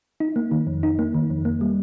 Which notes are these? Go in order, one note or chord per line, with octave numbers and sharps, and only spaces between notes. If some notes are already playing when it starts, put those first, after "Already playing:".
D#4
A#3
D#3
F2
D#4
A#3
D#3
F2
A#3
G3